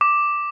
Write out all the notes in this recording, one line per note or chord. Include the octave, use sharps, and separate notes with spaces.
D6